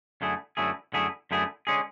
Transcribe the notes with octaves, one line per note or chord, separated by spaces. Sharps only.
F#2 D3 A3 E4 G#4
F#2 D3 A3 E4 G#4
F#2 D3 A3 E4 G#4
F#2 D3 A3 E4 G#4
D3 G#3 C#4 G#4